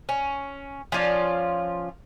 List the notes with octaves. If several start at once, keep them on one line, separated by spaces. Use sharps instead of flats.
C#4
F3 C#4 F4 D5